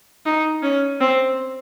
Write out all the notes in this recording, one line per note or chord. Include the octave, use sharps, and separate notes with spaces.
D#4
C#4
C4